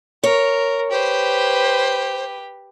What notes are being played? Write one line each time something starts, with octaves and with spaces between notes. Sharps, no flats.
A#4 C#5
G4 B4 C5